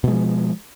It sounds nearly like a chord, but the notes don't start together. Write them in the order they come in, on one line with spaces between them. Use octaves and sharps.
B2 G#3 F3